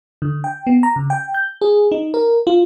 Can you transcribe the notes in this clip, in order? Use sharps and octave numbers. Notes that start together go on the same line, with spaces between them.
D3
G5
B3
A#5
C#3
G5
G6
G#4
D#4
A#4
F4